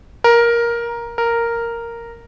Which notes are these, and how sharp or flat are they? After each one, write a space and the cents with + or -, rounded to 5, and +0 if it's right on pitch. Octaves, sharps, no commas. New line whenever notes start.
A#4 +10
A#4 -5